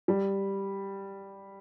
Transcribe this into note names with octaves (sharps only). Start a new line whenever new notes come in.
G3